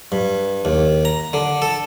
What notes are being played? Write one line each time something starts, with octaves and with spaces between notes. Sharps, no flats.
G2
D#2
A#5
D3
A4